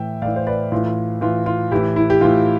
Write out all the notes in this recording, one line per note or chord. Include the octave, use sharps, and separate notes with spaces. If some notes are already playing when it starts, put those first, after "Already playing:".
Already playing: A2 E3 E5 G5
A2 E3 D5 F5
C5
B4 D5
A2 E3 F4
A2 E3 F4
F4
A2 E3 E4 G4
E4
G4
A2 E3 F4